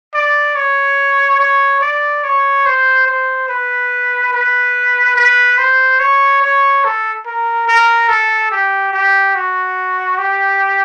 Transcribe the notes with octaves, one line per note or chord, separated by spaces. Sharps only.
D5
C#5
C#5
D5
C#5
C5
C5
B4
B4
B4
C5
C#5
C#5
A4
A#4
A#4
A4
G4
G4
F#4
G4